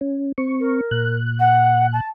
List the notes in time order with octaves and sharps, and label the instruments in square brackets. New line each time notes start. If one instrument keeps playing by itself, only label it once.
[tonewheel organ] C#4
C4 C#6
[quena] A#4
[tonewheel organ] A#2 F#6
[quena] F#5
A5